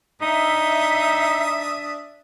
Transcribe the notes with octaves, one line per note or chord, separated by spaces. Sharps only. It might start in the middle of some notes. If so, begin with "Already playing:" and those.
D4 D#4 E5 D#6